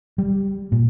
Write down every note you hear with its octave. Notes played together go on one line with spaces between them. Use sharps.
G3
A#2